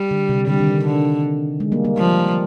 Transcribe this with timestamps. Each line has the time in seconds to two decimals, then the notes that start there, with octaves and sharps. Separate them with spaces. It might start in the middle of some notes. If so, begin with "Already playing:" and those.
Already playing: G3
0.11 D3
0.29 C3
0.48 D3 G3
0.60 D#3
0.85 D3
1.60 G#3
1.72 G3 A#3
1.84 G3 A#3
1.97 F3